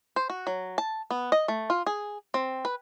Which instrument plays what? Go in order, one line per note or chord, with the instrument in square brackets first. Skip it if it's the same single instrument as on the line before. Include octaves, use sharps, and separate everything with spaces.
[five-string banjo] C5
F#4
F#3
A5
B3
D#5
A3
F4
G#4
C4
B4